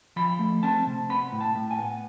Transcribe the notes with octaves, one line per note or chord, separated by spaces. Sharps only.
F3 B5
A3
C4 A5
C3
B3 B5
A2
A5
A2
G#5
B3